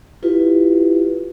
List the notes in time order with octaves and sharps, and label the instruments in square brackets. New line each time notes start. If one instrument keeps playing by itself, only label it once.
[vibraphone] E4 F4 G4 B4